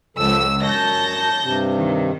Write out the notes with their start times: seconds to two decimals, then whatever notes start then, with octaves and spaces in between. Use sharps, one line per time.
0.17 C#2 F3 A4 E6
0.63 F#2 C#5 A5 G6 A#6
1.42 G2 C3
1.74 D#3